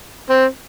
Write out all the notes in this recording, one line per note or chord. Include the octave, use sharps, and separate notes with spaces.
C4